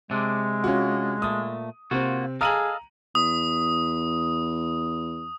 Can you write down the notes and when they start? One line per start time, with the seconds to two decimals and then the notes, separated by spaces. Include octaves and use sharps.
0.11 C3 G#3 D4
0.64 C#4 F4 F#4
1.22 A#2 A3 D#6
1.91 C3 A#3 C4 F4 F#4
2.41 G#4 A4 D#5 F5 A#5 D#7 F#7
3.15 E2 D#6